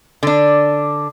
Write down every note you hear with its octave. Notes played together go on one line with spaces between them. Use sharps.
D3 D4